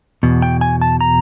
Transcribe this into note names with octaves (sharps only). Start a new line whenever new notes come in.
E2 B2
G5
G#5
A5
A#5